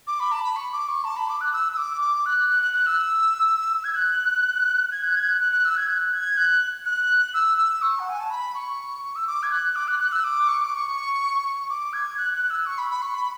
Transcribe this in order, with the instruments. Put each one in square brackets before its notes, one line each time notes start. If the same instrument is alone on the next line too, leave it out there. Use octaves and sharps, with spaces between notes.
[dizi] D6
B5
A5
B5
C#6
D6
C#6
A5
B5
D6
F#6
E6
E6
D6
D6
F#6
F#6
F#6
F#6
E6
G#6
F#6
G#6
F#6
G#6
F#6
F#6
F#6
E6
G#6
F#6
G#6
F#6
F#6
E6
E6
C#6
F#5
G#5
A5
B5
C#6
E6
D6
G#6
F#6
D6
F#6
F#6
E6
D6
C#6
D6
C#6
D6
G#6
F#6
F#6
E6
C#6
B5
B5
C#6
B5